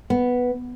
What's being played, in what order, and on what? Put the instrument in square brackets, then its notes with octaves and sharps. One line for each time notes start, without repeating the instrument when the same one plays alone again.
[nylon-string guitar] B3